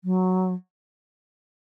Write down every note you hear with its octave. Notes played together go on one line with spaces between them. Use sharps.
F#3